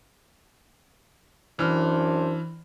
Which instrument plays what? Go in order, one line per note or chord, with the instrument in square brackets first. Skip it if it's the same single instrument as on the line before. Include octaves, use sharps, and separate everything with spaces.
[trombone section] F#2 D4 C5 [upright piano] E3 F6